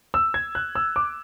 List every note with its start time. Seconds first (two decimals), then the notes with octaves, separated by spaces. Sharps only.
0.14 E6
0.34 G#6
0.55 F#6
0.75 E6
0.96 D6